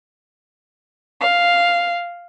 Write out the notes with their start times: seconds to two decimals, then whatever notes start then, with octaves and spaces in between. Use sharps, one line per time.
1.20 F5